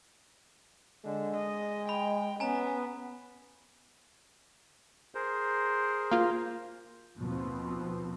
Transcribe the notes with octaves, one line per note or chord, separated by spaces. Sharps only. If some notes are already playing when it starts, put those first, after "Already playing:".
D3 G#3
D#5
G5 B5
B3 C#4 G#5 A#5
G#4 A#4 C5
A#3 F4
D#2 B2 F3 B3 C4